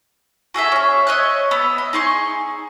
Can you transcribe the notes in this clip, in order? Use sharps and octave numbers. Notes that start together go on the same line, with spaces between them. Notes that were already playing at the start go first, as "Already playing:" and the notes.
F#4 G#4 A4 E5
C#4 G#4
C#5 D#5 E5 F#6
B3 E5
D#5
D#4 G#4 C6 C#6